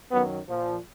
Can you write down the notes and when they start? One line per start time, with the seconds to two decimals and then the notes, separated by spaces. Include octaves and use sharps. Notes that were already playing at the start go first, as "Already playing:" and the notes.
0.11 F#2 D#3 F#3 B3
0.47 A#2 F3